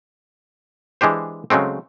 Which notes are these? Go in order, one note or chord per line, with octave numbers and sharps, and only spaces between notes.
E3 G#3 D4 G4 C5
C#3 F#3 G#3 A3 C4